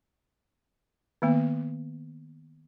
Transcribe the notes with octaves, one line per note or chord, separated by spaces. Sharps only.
D#3 A#3 B3